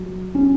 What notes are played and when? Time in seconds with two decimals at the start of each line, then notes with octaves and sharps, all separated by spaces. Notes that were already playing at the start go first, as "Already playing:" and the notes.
Already playing: F#3
0.35 C#4